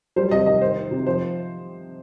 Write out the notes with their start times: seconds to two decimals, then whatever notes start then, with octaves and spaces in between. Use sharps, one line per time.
0.16 G3 C5
0.31 C3 D#5
0.46 D#3 D#5
0.61 D#4 C5
0.77 D#4
0.91 C3
1.06 F3 C5